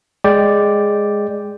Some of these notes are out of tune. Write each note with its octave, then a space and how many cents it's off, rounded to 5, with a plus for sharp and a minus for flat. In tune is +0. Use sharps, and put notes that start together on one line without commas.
G#3 -5 D5 +0 G5 +0